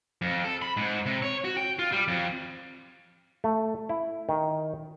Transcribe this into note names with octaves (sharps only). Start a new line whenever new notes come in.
F2
A4
B5
G#2
C3
C#5
F#4
G5
F4
G3
F2
A3
E4
D#3